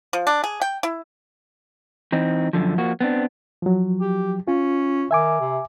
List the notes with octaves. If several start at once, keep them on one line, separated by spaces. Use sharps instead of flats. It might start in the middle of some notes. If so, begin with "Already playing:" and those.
F3
D4
G#4
G5
E4
E3 C4 D#4
F#2 A2 D3 F3
F3 A#3 F#4
B3 C4 D4
F3 F#3
G4
C#4 F4
D#3 E5 G#5 D6
C3